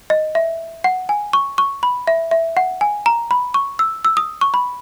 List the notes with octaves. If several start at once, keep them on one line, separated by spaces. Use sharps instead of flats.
D#5
E5
F#5
G#5
C#6
C#6
B5
E5
E5
F#5
G#5
A#5
B5
C#6
E6
E6
D#6
C#6
B5